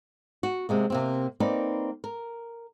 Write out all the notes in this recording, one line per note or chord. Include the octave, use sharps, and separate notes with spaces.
F#4
C3 G#3 A#3
C3 A#3 C4
A#3 C4 D#4 B4 D5
A#4